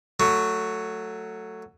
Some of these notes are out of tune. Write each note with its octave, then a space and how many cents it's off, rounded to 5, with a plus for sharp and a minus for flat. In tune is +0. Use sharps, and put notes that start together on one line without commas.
F#3 +0 A3 +15